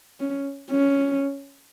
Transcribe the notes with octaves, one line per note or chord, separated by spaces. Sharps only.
C#4
C#4